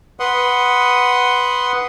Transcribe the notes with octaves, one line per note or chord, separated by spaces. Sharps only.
B4 F#5 C6 D#6